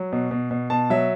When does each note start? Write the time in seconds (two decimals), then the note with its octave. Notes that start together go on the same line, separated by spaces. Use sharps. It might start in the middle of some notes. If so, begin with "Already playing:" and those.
Already playing: F#3
0.12 B2
0.31 B2
0.51 B2
0.70 B2 A5
0.90 F#3 E5